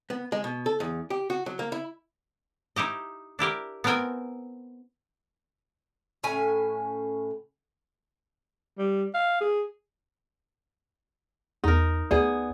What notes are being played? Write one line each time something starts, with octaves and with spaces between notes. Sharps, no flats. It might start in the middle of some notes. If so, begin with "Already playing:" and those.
B3
G#3
B2
A4
E2
G4
F#4
F#3
A#3
E4
D#4 E4 G4 D#5
D4 E4 G4 A#4
B3 C4 E4 A#4 G5 G#5
A2 C#4 G#5
G3
F5
G#4
E2 D#4 A#4
D2 B3 G#4 D5